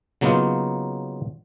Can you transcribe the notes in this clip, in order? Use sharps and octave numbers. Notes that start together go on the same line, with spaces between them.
C#3 F#3 A#3 B3 D#4 F4